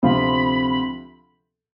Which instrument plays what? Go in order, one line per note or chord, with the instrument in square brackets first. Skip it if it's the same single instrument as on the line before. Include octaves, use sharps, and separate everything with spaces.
[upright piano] D2 C3 F3 C4 F4 [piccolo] B5
[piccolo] B5